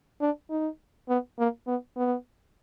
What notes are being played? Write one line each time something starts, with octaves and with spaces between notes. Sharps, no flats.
D4
D#4
B3
A#3
B3
B3